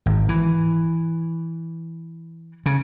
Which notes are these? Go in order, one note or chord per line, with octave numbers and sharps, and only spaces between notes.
G#1
E3
C#3